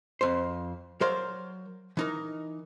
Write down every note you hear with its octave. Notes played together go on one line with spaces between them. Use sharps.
F2 C5
F#3 A#4 C5 D5 F5
E3 D#4 A#4